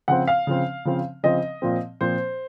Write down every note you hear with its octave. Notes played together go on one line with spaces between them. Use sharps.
C#3 F3 C4 F#5
F5
C#3 F3 C4
C#3 F3 C4
C#3 F3 C4 D#5
A#2 F3 C4
A#2 F3 C4 C5